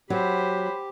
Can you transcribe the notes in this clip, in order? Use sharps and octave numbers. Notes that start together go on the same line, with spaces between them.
F#3 G4 C5 B5